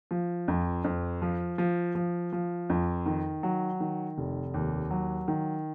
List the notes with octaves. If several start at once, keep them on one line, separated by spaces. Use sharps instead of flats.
F3
F2
F2
F3
F3
F3
F3
F2
D#3
F#3
D#3
F1
D#2
F#3
D#3